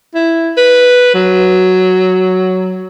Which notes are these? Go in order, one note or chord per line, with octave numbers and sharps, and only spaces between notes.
E4
B4
F#3